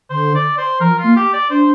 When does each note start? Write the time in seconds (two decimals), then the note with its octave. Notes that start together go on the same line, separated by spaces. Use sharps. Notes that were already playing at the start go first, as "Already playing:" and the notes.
0.10 D3 C5
0.35 D5
0.58 C5
0.80 F3 A#4
0.99 F4
1.04 A#3
1.16 G4
1.34 D5
1.50 D4 C5